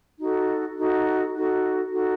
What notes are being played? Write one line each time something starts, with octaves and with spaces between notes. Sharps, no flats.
D#4 F#4 A4
D#4 F#4 A4
D#4 F#4 A4
D#4 F#4 A4